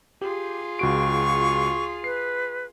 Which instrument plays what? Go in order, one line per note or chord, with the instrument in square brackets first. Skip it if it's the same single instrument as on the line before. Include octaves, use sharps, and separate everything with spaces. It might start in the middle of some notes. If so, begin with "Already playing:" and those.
[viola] F4 G#4 [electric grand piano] G4
[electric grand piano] C#2 F#4 D7 [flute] C#6
[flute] B4 [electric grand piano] C7